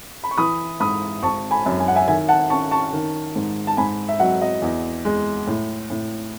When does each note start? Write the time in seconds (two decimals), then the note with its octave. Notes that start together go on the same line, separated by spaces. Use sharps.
0.24 B5
0.31 C#6
0.37 E3 B5 D#6
0.80 G#2 B5 D#6
1.23 G#1 A5 C#6
1.51 G#5 B5
1.66 F#2
1.80 G#5
1.88 F#5
1.96 E5 G#5
2.07 D#3 E5 G#5
2.28 F#5 A5
2.50 C#4 A5 C#6
2.71 A5 C#6
2.93 D#3
3.36 G#2
3.67 A5
3.77 G#2 G#5 B5
4.09 E5
4.20 F#3 D#5 F#5
4.41 D#5
4.62 E2
5.05 G#3
5.47 A2
5.90 A2